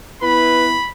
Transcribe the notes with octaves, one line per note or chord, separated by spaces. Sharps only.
B3 E4 B4 B5